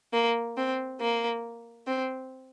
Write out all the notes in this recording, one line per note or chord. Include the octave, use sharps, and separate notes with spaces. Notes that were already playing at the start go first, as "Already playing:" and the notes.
A#3
C4
A#3
C4